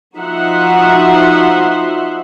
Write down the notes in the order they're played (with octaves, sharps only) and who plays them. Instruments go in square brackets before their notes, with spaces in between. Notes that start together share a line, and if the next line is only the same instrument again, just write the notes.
[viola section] F3 D#4 F#4 E5 F#5 C6